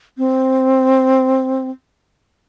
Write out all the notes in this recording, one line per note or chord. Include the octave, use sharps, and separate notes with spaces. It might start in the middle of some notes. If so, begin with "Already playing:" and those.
C4